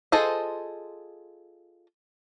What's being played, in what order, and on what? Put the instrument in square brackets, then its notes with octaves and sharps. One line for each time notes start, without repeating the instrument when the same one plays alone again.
[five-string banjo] F4 G#4 A4 C5 D#5